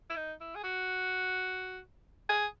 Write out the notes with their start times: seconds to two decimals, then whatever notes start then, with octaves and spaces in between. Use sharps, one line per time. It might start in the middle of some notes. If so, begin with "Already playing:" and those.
0.10 E4
0.16 D#4
0.41 E4
0.55 G#4
0.64 F#4
2.29 G#4